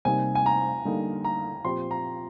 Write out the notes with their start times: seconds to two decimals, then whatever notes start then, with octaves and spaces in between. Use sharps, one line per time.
0.05 C3 G3 A#3 D#4 G#5
0.35 G#5
0.46 A#5
0.85 D3 G3 A#3 D#4
1.24 A#5
1.64 A#2 F3 C4 G4 C6
1.91 A#5